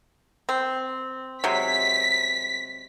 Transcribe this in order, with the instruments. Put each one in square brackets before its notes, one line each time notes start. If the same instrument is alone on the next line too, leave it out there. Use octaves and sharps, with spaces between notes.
[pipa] C4
[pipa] C3 F#3 G#3 [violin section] B6